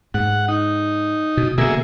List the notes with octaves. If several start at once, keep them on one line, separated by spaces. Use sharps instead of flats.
G#2 F#5
D#4
B2
B2 D3 A#3 G#4 E5